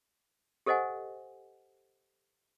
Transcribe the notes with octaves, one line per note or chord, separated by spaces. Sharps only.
G4 A4 C5 D#5 F#5 G#5